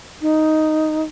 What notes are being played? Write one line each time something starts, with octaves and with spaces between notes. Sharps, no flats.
D#4